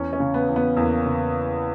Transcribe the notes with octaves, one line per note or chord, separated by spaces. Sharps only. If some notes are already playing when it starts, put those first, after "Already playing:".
Already playing: E2 C#4
C#4
C#3
B3
E2
B3
E2 A#3
C#3